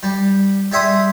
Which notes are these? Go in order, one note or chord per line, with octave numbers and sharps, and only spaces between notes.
G3
G3 G#4 E5 C6 D#6